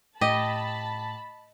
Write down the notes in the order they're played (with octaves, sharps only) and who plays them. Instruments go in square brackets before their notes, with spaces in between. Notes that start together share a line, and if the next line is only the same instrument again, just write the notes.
[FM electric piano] A2 [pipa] G4 [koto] D#5 [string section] A5 B5